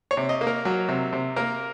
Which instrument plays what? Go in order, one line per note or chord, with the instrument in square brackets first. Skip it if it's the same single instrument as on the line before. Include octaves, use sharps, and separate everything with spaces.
[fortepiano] C#5
C3
D#5
A#3
A#4
F#3
C3
C3
A#3 A#4